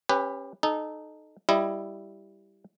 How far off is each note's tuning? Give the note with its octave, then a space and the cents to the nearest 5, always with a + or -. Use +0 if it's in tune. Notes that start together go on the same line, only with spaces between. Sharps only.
C#4 -20 G4 +20 B4 +0
D#4 -20 A4 -30
G3 +0 E4 +10 D#5 +0